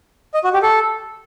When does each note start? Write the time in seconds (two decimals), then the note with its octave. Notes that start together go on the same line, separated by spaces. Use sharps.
0.34 D#5
0.44 F#4
0.53 G4
0.63 A4